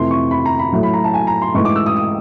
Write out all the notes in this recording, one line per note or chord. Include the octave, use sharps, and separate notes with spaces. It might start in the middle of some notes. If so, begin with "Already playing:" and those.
Already playing: F2 C3 E3 A3 C6
C#6
B5
A#5
B5
A2 F#3 A3
B5
A#5
A5
G#5
A#5
C6
G#2 E3 A3 C#6
D6
E6
D#6
D#6